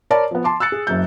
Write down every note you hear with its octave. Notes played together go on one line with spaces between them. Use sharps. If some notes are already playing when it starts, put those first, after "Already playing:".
A#4 C#5 D5 A5 B5
F3 B3
A5 C6 D6
E6 F#6 A6 C#7
G#4
F#1 F#2 G6